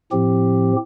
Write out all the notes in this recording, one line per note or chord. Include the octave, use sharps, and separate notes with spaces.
A2 F3 C4 G4